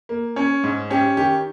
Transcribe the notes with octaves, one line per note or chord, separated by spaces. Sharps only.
A#3
C#4
G#2
C#4 G4
D#3 G4